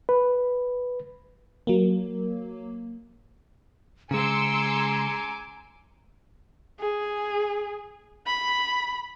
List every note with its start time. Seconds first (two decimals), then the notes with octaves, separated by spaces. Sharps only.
0.09 B4
1.67 F#3 A#3
4.11 C#3 G#3 G#5 A#5 C6 D6 E6 C#7
6.80 G#4
8.26 B5